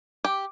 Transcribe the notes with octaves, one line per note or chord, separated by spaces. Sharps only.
G4